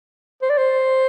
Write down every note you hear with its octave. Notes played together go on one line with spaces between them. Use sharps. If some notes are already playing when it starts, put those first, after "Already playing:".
C5
D5
C5